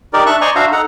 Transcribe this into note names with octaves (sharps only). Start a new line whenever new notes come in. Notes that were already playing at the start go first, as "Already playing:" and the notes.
D#4 G4 A#4 D5
D4 E5 A5 C#6 F#6
C5 D5 D#5 G#5 A#5 C#6
D4 F#4 C5 E5 F5 A#5
D#4 A4 F#5 A#5